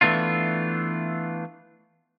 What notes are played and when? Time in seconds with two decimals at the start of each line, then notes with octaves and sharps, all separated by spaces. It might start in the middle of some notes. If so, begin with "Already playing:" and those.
0.01 E3 A3 B3 D4 F4